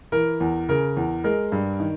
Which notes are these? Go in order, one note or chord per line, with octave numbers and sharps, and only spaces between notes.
E3 A#4
E2
C#3 A#4
E2
G#3 A#4
G2
D#3